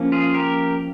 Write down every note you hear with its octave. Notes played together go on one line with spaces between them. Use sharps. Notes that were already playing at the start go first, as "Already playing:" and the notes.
Already playing: F3 A#3 C#4
F4 G#4
G4 A#4